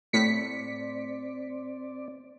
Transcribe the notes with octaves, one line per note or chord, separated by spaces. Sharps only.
A2 C4 D5 B6 C#7